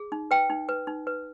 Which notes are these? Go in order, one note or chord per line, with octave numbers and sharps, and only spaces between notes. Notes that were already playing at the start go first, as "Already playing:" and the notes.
Already playing: G#4
D#4
B4 G5
D#4
B4
D#4
B4